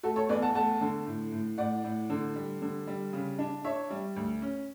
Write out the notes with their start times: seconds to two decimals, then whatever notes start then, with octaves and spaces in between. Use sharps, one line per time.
0.03 A3 F#4 A4
0.16 A4 C#5
0.29 E2 B4 D5
0.42 F#5 A5
0.55 A3 F#5 A5
0.81 D3
1.06 A2
1.32 A2
1.58 A2 D5 F#5
1.84 A2
2.10 D3
2.36 G3
2.62 D3
2.87 G3
3.13 C#3
3.39 D4
3.64 D4 C#5 E5
3.90 G3
4.16 D2
4.42 C#4